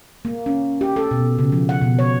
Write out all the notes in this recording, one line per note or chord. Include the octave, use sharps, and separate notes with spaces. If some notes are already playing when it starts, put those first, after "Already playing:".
A#3
C#4
G4
A4
B2
C#3
F3
F#5
B2
C#5